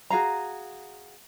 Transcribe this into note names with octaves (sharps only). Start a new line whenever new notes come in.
F#4 G#4 F5 A#5